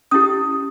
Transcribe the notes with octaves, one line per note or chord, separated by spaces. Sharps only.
C#4 E4 G4 D#6